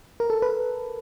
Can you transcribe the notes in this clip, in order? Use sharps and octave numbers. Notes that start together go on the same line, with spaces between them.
A#4
A4
B4